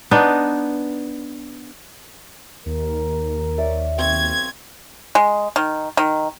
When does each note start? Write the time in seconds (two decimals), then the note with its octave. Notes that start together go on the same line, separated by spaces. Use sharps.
0.11 B3 D4 D#4
2.66 D#2 A#4
3.58 C#5 D5 E5
3.98 B1 C4 F5 C#6 G#6
5.15 G#3
5.56 D#3
5.97 D#3